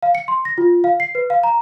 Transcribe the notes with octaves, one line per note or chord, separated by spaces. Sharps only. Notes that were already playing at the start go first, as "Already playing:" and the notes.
F5
C#7
C6
A#6
F4
F5
C7
B4
F5
A#5